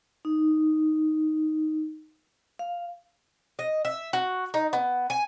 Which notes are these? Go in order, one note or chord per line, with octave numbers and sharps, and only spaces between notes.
D#4
F5
D#5
E5
F#4
D#4
B3
G#5